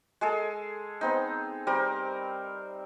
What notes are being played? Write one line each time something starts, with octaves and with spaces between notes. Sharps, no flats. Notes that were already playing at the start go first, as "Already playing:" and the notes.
G#3 G#4 A4
B3 C4 D#4
G3 C4 A#4